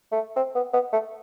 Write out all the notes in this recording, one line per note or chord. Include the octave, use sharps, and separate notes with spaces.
A3
C4
B3
B3
A3